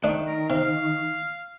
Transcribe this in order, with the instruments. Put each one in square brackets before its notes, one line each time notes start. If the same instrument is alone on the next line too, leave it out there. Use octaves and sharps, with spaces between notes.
[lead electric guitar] D#3 [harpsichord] A3 D4
[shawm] A#4
[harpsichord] C3 [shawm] F5